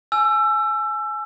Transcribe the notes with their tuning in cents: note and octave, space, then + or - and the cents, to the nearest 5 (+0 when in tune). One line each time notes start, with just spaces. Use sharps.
G#5 +25 E6 +25